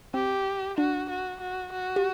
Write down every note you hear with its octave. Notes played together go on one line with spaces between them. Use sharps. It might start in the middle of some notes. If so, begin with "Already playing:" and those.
C4 G4
D4 F#4
F#4
F#4
F#4
G4